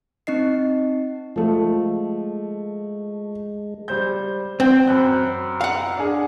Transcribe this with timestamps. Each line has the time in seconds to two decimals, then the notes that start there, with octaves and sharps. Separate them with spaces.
0.27 C4 D#4 D#5 C7
1.36 F3 G#3 A3
3.88 G3 C5 G6
4.60 C4 G5 G6
4.87 F#2 B5 F#6
5.61 F5 F#5
5.97 D4 G#4